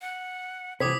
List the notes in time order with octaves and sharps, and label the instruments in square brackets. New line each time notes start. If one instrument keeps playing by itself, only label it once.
[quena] F#5
[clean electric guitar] C3 E3 [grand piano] C5 [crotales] D6 D#6 B6 [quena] G#6